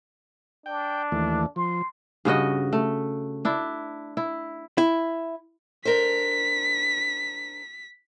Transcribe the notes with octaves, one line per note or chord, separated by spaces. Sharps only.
D4 G5
D#2 E3 A3
F3 C6
G2 C#3 F#4 D#5
A3
D4 E4
E4
E4
D4 A#4 C5 B6